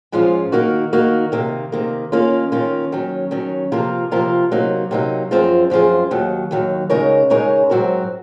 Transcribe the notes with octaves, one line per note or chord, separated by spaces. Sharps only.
G#2 F3 G#3 C#4 F4
D#3 A#3 D#4 F#4
D#3 A#3 D#4 F#4
C3 D#3 A#3
C3 D#3 A#3
D#3 A#3 C#4 F4
D#3 A#3 C#4 F4
D#3 F#3 C#4
D#3 F#3 C#4
C3 F3 A#3 F4 A#4
C3 F3 A#3 F4 A#4
C3 F#3 A#3 D#4
C3 F#3 A#3 D#4
F#2 F3 C4 F4 G#4
F#2 F3 C4 F4 G#4
D#2 D#3 F#3
D#2 D#3 F#3
C#3 G#3 D#4 A#4 C#5
C#3 G#3 D#4 A#4 C#5
G#2 F#3 C4 F#4 A#4